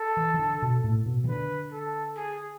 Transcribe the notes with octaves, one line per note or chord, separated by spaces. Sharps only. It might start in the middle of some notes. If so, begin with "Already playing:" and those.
Already playing: A4
E3
E3
D3
B2
A2
B2
E3
D3 B4
A4
G#4